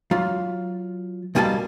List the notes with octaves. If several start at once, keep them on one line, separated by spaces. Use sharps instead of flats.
F#3 F4
B1 B2 G3 A#3 G#5 A5